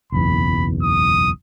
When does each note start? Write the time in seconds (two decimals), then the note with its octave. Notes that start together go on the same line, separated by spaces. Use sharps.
0.12 F#1 B1 E2 B5
0.82 D#6